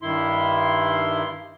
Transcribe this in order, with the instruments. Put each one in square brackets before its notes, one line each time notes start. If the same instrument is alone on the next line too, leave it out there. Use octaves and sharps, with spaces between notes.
[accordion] G2 D#3 E4 C6